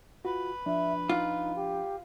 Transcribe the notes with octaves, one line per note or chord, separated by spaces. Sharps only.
F4 F#4 B4
F3 D4 E5
D#4 F4
G4